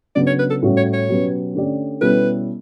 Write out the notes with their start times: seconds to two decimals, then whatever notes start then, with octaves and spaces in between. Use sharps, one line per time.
0.15 C#3 F#3 B3 D4 D5
0.27 C#5
0.39 B4
0.50 A4
0.62 A2 G3 C#4 F#4
0.77 C#5
0.93 C#5
1.09 B2 F#3 C#4 G4 B4
1.55 D3 A3 C#4 G4 D5
2.01 B2 G3 C#4 E4 A4 B4